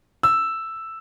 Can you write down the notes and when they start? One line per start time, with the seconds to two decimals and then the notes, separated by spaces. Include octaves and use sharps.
0.23 E6